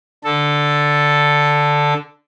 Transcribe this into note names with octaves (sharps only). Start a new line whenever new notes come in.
D3 A4